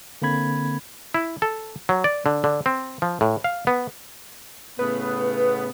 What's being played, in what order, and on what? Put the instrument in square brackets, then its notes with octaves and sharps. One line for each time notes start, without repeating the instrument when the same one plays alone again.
[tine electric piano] D3 A#3 C4 B5 G#6
[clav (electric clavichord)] E4
A4
F#3
D5
D3
D3
C4
F3
A2
F5
B3
[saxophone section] A2 C#3 B3 [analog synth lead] B4